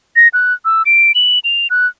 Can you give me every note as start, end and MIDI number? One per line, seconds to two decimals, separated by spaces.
0.16 0.28 94
0.34 0.53 90
0.65 0.83 88
0.86 1.12 98
1.15 1.39 102
1.44 1.67 101
1.70 1.87 90